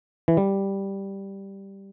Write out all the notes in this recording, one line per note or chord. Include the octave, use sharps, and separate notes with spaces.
E3
G3